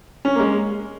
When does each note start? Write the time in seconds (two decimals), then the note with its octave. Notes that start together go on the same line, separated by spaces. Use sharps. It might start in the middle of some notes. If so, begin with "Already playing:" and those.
0.25 C#4
0.35 A#3
0.40 G#3